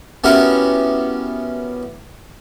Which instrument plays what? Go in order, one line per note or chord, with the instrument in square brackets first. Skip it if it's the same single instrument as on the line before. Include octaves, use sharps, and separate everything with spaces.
[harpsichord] B3 C#4 E4 F#4 G4 A#4